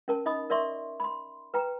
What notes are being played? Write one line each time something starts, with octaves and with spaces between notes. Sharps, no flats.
C#4 A#4 A5
D#4 D#5 B5 D#6
A#4 D5 E5 C6 C#6
B5 C6
B4 G5 A#5